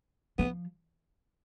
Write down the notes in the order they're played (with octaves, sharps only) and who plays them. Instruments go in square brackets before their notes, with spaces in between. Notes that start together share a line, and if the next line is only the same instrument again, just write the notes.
[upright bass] F3 [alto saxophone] B3